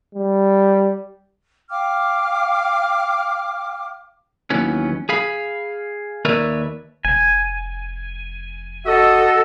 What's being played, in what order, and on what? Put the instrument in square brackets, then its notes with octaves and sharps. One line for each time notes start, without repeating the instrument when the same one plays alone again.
[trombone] G3
[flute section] F5 G5 D6 F6
[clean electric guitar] D#2 E3 F#3 B3 C#4
G#4 F5 B5
D#2 A#4 B4 C#5 D5 E5
[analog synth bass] F1 [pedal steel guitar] G#5
[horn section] F#4 D#5 [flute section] A4 E6